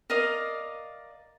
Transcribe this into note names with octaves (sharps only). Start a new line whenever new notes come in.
A#4 D5 D#5 F5